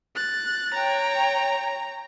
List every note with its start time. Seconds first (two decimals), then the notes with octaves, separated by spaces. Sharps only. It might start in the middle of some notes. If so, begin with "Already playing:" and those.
0.15 F#6 A6
0.74 C#5 G5 A#5